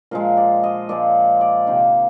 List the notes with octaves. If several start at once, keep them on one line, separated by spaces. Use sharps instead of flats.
A#2 F3 G#3 A#4
D5
D#5
A#2 F3 G#3 D5
D5
C3 D#3 A#3